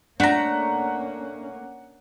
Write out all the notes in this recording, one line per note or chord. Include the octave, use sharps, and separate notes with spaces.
A3 A#3 C#4 D4 F#5 A#5 B6